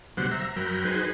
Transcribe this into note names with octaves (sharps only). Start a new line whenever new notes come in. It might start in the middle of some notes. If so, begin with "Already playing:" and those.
D2 B2 F#3 G3 C5 F#5
E5 A#5
F#2 F#3 A#4 G5 B5
D#4 F#4 G#4 B4 C5